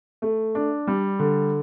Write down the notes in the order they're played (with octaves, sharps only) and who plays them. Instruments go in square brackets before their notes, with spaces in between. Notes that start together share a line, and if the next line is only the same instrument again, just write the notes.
[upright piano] A3
D4
G3
D3